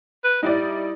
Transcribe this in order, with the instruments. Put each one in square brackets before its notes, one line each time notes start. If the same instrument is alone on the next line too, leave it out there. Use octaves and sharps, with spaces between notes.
[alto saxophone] B4
[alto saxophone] G3 [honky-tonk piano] D#4 E4 D5